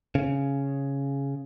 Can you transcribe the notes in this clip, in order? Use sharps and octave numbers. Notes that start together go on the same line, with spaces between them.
C#3